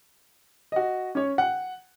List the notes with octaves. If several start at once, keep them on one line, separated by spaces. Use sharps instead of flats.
F#4 D#5
C#4 C#5
F#5 G5